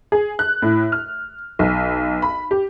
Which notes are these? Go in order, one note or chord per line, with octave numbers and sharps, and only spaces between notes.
G#4
F#6
A2
F6
B1
B5
G4